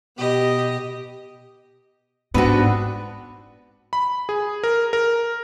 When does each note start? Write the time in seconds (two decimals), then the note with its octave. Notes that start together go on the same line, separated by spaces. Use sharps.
0.18 B2 G4 D#5
2.34 G#2 B3 C4 D4 F#4 B4
3.93 B5
4.29 G#4
4.63 A#4
4.93 A#4